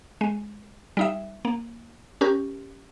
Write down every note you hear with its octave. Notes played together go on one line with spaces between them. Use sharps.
G#3
G3 D#4 E5
A#3
C#4 G4 A#4